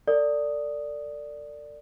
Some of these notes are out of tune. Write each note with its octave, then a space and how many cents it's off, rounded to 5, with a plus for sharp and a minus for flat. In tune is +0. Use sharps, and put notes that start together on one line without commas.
A4 +40 D5 +0 D#6 +0